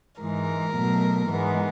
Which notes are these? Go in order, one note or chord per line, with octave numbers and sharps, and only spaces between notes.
G#2 E3 G#3 A#4
B2 F#3 A3
G#2 E3 G#3 B3